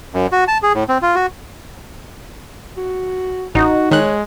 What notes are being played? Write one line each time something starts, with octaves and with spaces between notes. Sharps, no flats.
F#2
F#4
A5
G#4
A2
C4
F4
F#4
F#4
A1 D#4 F#4
D#3 G#3 C#5 F#6